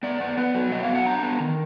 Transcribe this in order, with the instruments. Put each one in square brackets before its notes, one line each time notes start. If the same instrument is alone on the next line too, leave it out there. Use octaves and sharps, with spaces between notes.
[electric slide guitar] B3 D5
B3
B3 B4
F#3
B3 D#5
F5
F#3
F#5
D4 A#5
B3
D#3